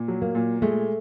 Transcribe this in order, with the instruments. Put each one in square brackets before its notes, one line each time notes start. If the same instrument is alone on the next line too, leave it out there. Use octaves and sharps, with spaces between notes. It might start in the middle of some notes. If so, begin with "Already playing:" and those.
Already playing: [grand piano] A#2
F#3
[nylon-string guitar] A#3
[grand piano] A#2
[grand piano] G#3 [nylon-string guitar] A3